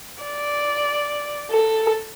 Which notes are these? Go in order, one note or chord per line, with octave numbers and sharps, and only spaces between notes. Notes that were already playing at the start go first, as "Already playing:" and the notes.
D5
A4